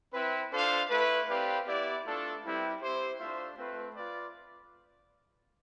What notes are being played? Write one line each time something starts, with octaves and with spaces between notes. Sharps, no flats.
C4 E4 B4
D4 F4 A4 C5 F5
A3 E4 B4
C4 G4 B4 D5 F5
B3 E4 G4 D5
A3 D4 F4 A4
G3 C4 E4 G4 B4
C4 E4 G4 C5
A3 D4 F4 C5 E5
A3 C4 F4 B4
F4 B4 D5